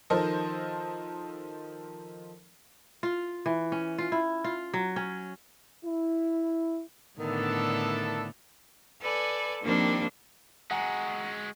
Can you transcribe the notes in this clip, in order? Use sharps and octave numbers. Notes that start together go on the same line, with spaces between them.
D#3 F3 A4 A#4 C5 D#5
F4
E3
C#4
F4
E4
F4
F#3
C#4
E4
A2 D3 D#3 B3 D4 E4 A4
A4 B4 D5 G#5
D#3 F3 G3 A#3 C4 D4
G#3 F#4 F#5 G#5 A#5